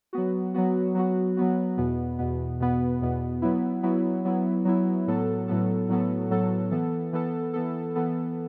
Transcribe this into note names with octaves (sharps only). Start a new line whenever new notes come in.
F#3 B3 F#4
F#3 B3 F#4
F#3 B3 F#4
F#3 B3 F#4
E2 B2 B3
E2 B2 B3
E2 B2 B3
E2 B2 B3
F#3 B3 E4
F#3 B3 E4
F#3 B3 E4
F#3 B3 E4
A2 F#3 B3 A4
A2 F#3 B3 A4
A2 F#3 B3 A4
A2 F#3 B3 A4
E3 B3 A4
E3 B3 A4
E3 B3 A4
E3 B3 A4